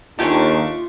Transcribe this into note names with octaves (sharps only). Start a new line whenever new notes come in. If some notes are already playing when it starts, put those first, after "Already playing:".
D#2 A3 D4 F4 G4 G#5 C#6